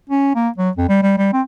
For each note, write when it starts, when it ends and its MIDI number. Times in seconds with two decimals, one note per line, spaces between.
0.10 0.35 61
0.36 0.49 58
0.58 0.70 54
0.77 0.89 41
0.89 1.01 55
1.03 1.15 55
1.18 1.30 55
1.33 1.42 60